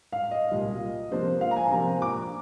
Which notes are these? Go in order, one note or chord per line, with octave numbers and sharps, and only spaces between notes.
F5
D#5
C2 A#2 G3
C3 F3 A#3 D4 C5
F5
A#5
G#5
C3 F3 A#3 D4 A#5
D6